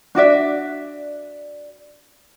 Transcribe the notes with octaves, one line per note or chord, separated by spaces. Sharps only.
D4 F#4 D5 E5